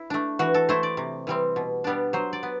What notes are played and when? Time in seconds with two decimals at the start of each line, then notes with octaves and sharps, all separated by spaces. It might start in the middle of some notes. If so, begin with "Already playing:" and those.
Already playing: E4
0.10 A3 D4
0.39 E3 F#4
0.54 A4
0.69 A3 E4 C5
0.83 D5
0.97 C3
1.27 E3 G3 C4
1.56 B2
1.84 G3 B3 D4
2.13 F#3 C5
2.33 D5
2.43 B3